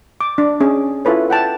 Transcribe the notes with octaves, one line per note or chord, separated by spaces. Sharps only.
D6
D4
C#4 G#4
E4 F4 A4 B4 C#5
F#5 G5 A5